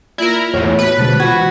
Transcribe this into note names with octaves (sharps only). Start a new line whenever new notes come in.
A#3 E4 F4 A#4 D5
E2 A2 C#5
G#3 F#4 B4
B2 D3 G#3 C5 A5 A6
E3 F4 F#4 C5 G#6